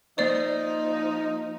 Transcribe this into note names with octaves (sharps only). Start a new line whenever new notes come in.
F3 A#3 D#4 C5 D5 A6